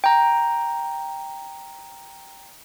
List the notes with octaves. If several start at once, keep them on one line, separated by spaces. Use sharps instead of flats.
G5 A#5